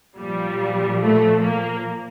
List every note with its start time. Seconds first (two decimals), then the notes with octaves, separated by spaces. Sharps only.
0.18 A#2 F3 G3
1.00 A3
1.41 A#3